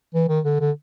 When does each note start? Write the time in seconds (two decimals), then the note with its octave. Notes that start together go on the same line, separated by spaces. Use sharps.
0.14 E3
0.29 D#3
0.45 D3
0.60 D3